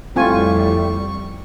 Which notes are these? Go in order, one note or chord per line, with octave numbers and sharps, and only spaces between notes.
F2 A2 G3 C4 F4 G#5 C#6